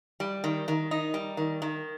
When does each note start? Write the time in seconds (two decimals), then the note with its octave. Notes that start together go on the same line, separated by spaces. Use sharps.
0.20 G3
0.44 D#3
0.68 D#3
0.91 D#4
1.14 G3
1.37 D#3
1.62 D#3